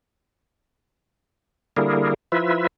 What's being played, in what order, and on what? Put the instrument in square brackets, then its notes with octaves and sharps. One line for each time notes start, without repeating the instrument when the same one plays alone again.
[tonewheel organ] D3 G3 A#3 E4 G#4 A#4
F3 E4 F4 B4 E5